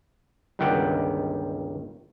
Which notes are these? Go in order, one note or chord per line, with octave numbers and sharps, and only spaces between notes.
G1 C#2 D#3 G3 F#5 G5